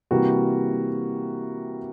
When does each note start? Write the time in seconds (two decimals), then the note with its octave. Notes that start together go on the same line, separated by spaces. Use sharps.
0.11 C3 E3 G3 A#3 F#4